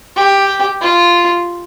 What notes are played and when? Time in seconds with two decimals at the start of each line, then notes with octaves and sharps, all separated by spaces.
0.16 G4
0.81 F4